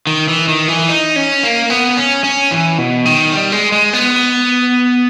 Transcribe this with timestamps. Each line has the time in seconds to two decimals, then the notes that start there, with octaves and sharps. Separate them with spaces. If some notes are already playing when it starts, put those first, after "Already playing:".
0.07 D#3
0.28 E3
0.48 D#3
0.68 E3
0.89 D#4
1.16 C#4
1.43 A#3
1.70 B3
1.97 C#4
2.24 C#4
2.51 E3
2.78 B2
3.05 D#3
3.32 G3
3.52 G#3
3.72 G#3
3.93 B3